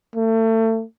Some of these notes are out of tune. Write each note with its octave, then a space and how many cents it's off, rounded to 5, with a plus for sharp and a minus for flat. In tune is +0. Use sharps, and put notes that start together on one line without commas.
A3 +30